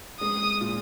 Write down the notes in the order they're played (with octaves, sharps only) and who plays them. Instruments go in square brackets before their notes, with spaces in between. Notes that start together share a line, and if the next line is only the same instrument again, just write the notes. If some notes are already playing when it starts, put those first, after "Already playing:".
[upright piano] G#3 [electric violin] D#6
[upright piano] A#2